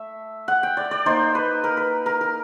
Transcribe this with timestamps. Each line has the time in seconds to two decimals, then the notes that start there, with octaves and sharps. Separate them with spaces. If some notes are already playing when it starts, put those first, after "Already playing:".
Already playing: A3 E5
0.48 F#5
0.63 G5
0.77 D5
0.91 D5
1.05 A#3 D#4 C5
1.35 B4
1.64 A#4
1.77 B4
2.06 A#4
2.21 A#4